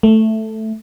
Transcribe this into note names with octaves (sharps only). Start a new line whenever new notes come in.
A3